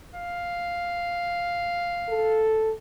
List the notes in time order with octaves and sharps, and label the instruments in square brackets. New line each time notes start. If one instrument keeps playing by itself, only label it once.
[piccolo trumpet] F5
[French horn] A4